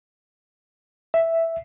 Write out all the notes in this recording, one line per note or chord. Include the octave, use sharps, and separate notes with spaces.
E5